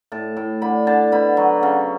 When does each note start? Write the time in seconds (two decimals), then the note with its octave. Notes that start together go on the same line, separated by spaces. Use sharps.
0.12 A2 A5
0.37 A2
0.62 D3 B5
0.87 D3 A5
1.12 B2 B5
1.37 F#3
1.63 C#3